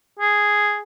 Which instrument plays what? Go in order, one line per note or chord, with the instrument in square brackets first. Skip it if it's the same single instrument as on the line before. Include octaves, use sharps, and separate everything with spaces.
[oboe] G#4